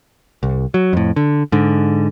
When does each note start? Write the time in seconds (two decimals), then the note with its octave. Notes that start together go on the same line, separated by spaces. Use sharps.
0.43 C2
0.74 F#3
0.93 F2 A2
1.16 D3
1.52 G#2 D3